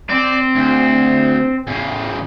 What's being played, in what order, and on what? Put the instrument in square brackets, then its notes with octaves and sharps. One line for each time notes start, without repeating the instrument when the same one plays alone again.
[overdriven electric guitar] C4 [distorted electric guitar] D5
[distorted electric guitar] D2
E2 C#3